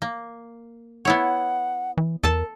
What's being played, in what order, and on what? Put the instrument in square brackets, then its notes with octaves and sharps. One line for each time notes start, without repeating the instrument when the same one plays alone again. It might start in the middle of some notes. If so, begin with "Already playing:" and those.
[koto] A#3
[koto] B3 E4 C#5 [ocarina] F#5
[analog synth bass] E3
[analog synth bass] E2 [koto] A4 A5 [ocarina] A#4